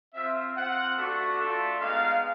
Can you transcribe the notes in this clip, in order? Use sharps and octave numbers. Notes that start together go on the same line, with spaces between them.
C4 F4 E5
C4 F4 F#5
A3 D4 F#4
A3 D4 F4
G#3 B3 D#4 F5